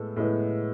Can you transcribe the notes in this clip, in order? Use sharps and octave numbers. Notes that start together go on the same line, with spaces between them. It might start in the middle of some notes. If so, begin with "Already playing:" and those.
Already playing: A2 G#3 B3 A4
A2 G#3 B3